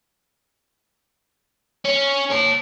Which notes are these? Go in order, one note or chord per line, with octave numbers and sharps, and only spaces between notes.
C#4
C#5 A5